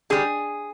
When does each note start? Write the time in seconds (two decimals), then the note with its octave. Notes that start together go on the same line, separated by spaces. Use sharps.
0.10 D3 G3 G#4